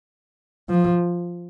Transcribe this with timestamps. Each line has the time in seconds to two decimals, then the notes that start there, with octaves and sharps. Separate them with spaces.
0.69 F3